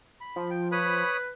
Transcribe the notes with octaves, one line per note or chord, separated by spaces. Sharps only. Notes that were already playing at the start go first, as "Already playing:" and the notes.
B5
F3
G5
B4 C#5 B5 D#6